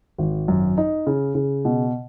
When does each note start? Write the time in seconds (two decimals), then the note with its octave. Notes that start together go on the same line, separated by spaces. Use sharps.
0.18 G#1
0.48 F#2
0.78 D#4
1.07 C#3
1.35 C#3
1.65 B2